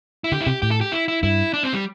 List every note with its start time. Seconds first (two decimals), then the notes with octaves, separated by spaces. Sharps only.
0.24 E4
0.32 D3 G4
0.41 E4
0.46 C3 G4
0.62 A2 G4
0.71 A4
0.81 G4
0.92 E4
1.08 E4
1.23 G2 E4
1.53 D4
1.63 C4
1.74 G3